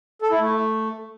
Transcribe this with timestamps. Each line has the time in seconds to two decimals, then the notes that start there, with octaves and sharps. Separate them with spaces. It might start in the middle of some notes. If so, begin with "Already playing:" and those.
0.22 A4
0.31 E4
0.39 A3